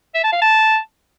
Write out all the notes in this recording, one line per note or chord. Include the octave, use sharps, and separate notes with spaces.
E5
A5
F5
A5